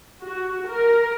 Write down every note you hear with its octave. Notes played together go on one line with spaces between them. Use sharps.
F#4
A#4